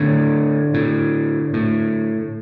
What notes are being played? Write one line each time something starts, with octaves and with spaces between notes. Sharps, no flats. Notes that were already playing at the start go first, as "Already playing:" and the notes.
Already playing: A2 D3
A2
A2